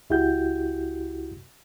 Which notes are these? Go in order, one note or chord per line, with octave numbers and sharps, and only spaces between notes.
C#2 E4 F#4 G4 G6